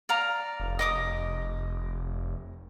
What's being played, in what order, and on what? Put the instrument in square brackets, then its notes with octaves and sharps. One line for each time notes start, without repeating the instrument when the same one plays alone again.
[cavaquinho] D5 F5 A#5
[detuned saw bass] F1
[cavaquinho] D#5 D6 D#6